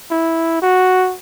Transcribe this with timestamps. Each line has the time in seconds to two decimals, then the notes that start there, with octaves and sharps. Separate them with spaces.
0.11 E4
0.62 F#4